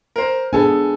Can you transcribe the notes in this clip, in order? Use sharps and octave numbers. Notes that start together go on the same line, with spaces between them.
A#4 C5
B3 D4 G#4 A4 G#5